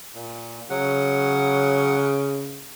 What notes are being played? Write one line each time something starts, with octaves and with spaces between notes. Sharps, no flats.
A#2
C#3 F#3 F#5